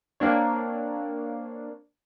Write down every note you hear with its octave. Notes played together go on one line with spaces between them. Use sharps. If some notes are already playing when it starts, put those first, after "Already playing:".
A#3 C4 D4 C#5